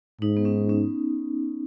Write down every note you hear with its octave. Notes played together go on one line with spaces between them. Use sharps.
G#2 D#4
B3
C#4
C#4